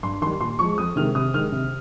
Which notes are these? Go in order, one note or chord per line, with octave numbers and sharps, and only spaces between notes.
G2 C6
D#3 G3 C6
A#2 C6
F3 G#3 C#6
F2 D#6
C3 D#3 G#3 F6
C3 D#6
D#3 G#3 F6
C3